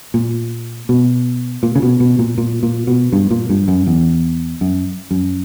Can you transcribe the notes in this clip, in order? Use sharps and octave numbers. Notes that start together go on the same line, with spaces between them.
A#2
B2
A#2
C#3
B2
B2
A#2
A#2
A#2
B2
G2
A#2
G2
F#2
E2
F#2
F#2